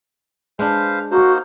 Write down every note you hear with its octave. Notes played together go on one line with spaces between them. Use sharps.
G#3 D4 B4 C5 F5
A#3 D#4 F#4 C5